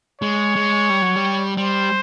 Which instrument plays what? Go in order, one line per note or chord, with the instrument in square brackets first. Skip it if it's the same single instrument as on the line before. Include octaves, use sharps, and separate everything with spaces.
[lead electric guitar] G#3 [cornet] C#5
[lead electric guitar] G#3
G3
F#3
G3
[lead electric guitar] G3 [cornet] C5